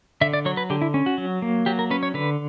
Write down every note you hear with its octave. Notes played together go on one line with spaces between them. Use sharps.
D3 E5
D5
F#3 C#5
B4
D3 G4
E4
C#4
F#4
F#3
A#3
F#3 G4
A#4
C#4 B4
C#5
D3 B4